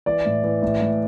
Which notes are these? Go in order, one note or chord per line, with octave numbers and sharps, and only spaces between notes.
E3 D5
A2
E3
A2
A2